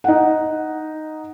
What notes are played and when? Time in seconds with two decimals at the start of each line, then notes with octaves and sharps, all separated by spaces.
0.04 D#4 F#5